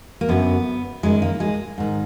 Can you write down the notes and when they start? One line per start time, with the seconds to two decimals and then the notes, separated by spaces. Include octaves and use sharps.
0.21 A#3
0.29 F#2 D3 B3
1.03 F#2 D#3 G#3
1.22 A#3
1.40 G#3
1.78 G#2 D#3